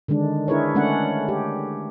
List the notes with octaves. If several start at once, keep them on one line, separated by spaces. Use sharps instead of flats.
D3 D#3 G#3 D4
D4 E4 G#4 A#4 B4 C#5
G#3 A3 C#4 D4 F#5
G4